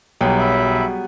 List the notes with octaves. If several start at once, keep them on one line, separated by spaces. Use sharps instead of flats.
B1 F#3 G3 B3 G#4 G5
E5 B5